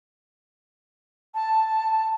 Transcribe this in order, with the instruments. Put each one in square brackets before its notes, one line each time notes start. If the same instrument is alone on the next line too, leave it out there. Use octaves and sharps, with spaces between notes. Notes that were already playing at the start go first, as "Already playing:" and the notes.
[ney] A5